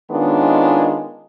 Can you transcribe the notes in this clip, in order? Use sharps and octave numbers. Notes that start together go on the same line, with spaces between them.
D#3 G#3 B3 C#4 D4 F4